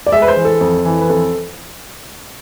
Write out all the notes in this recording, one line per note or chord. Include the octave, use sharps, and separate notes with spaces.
D5
G#3 E5
B4
C5
E3
A4
F2
E3
B4
F2 A4